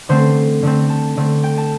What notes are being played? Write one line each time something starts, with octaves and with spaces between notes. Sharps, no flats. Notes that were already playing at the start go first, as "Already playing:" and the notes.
D3 A3 C4 C5
D3 A3 C4
A5
D3 A3 C4
G5
A5